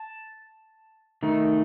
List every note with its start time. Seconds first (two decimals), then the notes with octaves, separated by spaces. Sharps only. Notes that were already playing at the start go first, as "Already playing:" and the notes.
Already playing: A5
1.23 D#3 A3 D#4